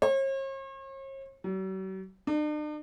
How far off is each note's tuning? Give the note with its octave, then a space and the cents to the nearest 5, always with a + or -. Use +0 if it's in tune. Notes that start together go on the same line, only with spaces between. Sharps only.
C#5 -45
F#3 +45
D4 +45